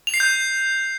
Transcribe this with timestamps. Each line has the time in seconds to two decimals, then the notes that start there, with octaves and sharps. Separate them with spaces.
0.07 F7
0.14 C7
0.20 G6